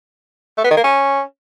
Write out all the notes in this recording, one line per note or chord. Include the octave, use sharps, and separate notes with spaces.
A3
B3
D#3
A#3
C#4